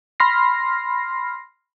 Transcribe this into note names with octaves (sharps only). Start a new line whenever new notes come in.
B5 C6 F6 A#6 C7